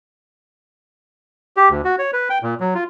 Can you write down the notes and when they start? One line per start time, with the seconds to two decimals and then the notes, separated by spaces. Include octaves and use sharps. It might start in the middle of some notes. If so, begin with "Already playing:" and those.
1.57 G4
1.70 D2
1.85 F#4
1.99 C#5
2.13 B4
2.30 G5
2.43 A#2
2.60 F#3
2.75 F4